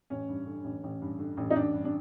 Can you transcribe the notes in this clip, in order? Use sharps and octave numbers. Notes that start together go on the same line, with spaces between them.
A1 C#4
G2
D3
A1
A1
G2
D3
A1
D#4
A1 D4
G2
D4